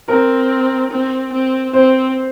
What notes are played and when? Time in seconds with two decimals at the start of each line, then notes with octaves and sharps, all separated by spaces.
0.08 C4 A#4
0.91 C4
1.33 C4
1.73 C4 C5